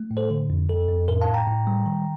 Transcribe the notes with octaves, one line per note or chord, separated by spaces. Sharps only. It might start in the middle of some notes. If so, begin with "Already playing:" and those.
Already playing: A3
A2
A4 C5
D3
F2
F2 A4
F2
A2 A#4
F5 A5
A2
G5 A#5
A2
G3
D#3